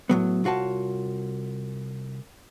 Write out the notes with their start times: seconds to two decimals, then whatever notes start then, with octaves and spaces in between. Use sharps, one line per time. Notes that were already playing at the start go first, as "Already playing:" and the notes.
0.09 A2 F#3 B3
0.44 C2 F4 F#4 C#5 A5